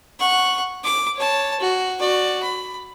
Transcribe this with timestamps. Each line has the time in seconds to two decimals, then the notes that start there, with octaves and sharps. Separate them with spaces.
0.20 F#5 C#6
0.84 D6
1.16 C#5 A5
1.60 F#4
1.99 F#4 D5
2.42 B5